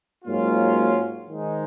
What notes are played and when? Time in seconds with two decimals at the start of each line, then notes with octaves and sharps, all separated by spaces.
0.24 G#2 F#3 A#3 C#4 F4
1.26 G#2 D#3 G#3 D#4